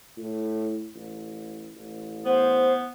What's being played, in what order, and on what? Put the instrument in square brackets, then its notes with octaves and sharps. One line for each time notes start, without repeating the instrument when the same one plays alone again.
[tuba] A2
A1
A1
[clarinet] B3 [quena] C5